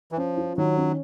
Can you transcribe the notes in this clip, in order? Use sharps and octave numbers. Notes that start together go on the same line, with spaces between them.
E3
F3 C#4
F4
D#3 F#3
C#4